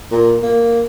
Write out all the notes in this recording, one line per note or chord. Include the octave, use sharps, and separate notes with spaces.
A#2
A#3